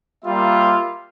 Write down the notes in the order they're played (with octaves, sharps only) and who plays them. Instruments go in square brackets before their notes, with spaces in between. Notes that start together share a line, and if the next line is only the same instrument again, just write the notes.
[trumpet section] G3 A#3 F4 E5 F5